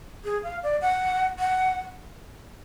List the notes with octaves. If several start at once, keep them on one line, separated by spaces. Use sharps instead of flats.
G#4
F5
D5
F#5
F#5